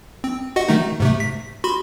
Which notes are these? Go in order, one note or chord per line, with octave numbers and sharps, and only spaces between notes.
C4
F#4 D#5 F#5
D#3 A3 D#4
G#2 C3 A3
B6
F#4 B5 C6